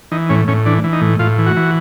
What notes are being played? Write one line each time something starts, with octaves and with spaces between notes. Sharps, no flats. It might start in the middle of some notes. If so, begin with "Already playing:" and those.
E3 D#4
A2 C#4
A2 C#4
E3 D4
E3
D#4
A2
A2 F4
E3
F#4
E3